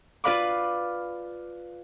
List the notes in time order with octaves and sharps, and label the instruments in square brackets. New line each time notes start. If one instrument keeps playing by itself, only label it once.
[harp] F4 B4 D5 F5 B5 D6